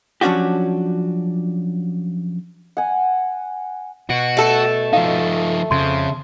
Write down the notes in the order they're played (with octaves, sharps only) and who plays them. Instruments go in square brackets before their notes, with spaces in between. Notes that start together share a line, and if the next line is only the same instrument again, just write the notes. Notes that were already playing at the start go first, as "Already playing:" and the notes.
[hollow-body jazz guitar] F3 F#3 C#4 D4 F#4 G4
[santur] F#5 G#5
[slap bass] B2 [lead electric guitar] F#4
[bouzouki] A3 A4
[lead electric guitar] F3 D#4 [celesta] F5
[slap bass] F2 [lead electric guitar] C#3 [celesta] C6